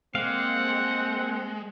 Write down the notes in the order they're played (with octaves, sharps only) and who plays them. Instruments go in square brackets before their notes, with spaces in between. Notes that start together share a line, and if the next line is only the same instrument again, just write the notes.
[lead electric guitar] G#3 [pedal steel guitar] A#3 F5 [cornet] C4 [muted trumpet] F#5